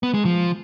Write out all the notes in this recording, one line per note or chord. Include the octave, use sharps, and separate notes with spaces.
B3
G#3
F3